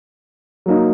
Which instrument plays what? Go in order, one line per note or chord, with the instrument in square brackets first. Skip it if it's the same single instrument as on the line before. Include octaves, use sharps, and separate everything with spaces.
[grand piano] F#3 A#3 D#4